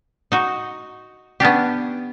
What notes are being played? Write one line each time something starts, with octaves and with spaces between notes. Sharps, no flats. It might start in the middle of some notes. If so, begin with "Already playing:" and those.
D#4 F#4
B3 C#4 D4 G4